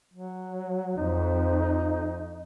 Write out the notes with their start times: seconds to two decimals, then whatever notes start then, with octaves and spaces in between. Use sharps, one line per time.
0.14 F#3
0.97 F2 D#4